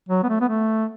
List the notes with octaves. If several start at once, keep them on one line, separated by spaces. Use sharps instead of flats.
F#3
B3
A3
B3
A3